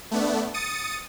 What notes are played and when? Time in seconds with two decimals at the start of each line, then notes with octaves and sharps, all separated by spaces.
0.11 A3 B3 D4
0.54 D#6 A6 C#7 D#7